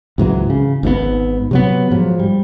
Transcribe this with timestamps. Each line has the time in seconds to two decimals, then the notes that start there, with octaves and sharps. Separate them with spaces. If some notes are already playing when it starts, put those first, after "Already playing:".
0.18 C#2 G#2 E3 F#3
0.50 C#3
0.83 G#1 G#2 C#3 B3
1.51 C3 F#3 B3
1.91 G#2 F3 F#3
2.19 G3